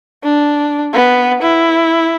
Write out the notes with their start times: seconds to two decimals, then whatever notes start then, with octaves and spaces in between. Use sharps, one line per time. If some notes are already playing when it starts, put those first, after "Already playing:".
0.24 D4
0.94 B3
1.43 E4